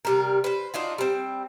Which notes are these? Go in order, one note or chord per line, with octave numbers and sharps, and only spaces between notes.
C3 G3 A#4
B4 C5
D4 D#4 F4 F#4
G3 C4